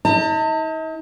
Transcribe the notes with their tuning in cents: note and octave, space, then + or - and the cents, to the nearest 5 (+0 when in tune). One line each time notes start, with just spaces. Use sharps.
D#4 +45 A5 +45